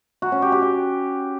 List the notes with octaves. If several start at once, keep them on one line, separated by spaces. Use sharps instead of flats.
F#4
C#4
G4
G4
G4